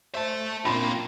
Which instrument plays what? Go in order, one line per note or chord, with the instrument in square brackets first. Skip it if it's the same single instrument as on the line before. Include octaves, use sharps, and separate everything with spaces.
[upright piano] C5 [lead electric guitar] E5 A5
[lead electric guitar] F#2 A#3 [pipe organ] A#2 C4 D4 [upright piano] B5 C6 E7